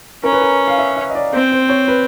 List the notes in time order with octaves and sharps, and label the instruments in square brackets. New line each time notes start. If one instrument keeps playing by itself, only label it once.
[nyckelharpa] C#4 [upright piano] A#4
[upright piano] B4
A#4
F5
E5
E5
D#5
D5
[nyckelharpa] C4 [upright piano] C5
[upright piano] C5
C#5
B4